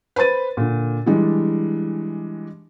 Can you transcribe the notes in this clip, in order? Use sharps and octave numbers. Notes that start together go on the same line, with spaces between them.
B4 C5 B5 A6 D#7
A#2 D3
E3 G3 G#3 D4